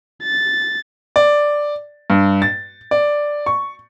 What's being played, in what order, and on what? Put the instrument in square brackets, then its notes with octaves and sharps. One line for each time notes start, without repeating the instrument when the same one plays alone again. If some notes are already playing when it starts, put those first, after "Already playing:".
[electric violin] A6
[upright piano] D5
G2
A6
D5
C#6